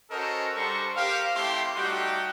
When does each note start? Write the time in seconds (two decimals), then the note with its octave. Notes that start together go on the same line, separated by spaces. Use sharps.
0.11 C#4 F#4 A4 A#4 C5 D#5
0.55 G3 D4 A4 C5 A#5 C#6
0.96 G4 A#4 C5 F5
1.35 A3 C4 E4 G4 C6
1.76 G3 A3 D#4 F#4 G4 G5